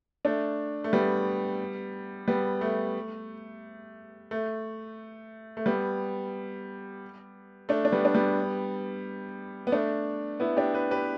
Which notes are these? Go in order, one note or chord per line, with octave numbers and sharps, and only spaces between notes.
A3 D4
A3
G3 B3
G3 B3
A3
A3
A3
G3 B3
A3 D4
D4
G3 B3
D4
G3 B3
B3
A3 D4
B3 E4
D4 G4
G4 B4
G4 B4